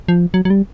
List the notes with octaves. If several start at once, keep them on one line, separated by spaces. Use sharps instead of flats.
F3
F#3
F#3
G3